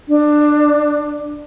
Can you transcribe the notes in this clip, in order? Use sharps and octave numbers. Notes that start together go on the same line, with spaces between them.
D4